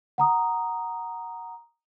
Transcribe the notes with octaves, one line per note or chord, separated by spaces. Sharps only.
F#5 A#5 D#6